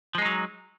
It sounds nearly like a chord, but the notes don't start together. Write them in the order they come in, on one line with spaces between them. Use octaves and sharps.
F3 G#3 D#4 F#3